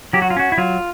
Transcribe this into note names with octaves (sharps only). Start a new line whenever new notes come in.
F#3 G4
F#4
F4
C#4 F#4
E4
F#3 F4